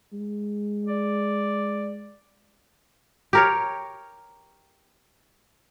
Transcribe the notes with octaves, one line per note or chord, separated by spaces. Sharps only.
G#3
D5
G4 A#4 C#5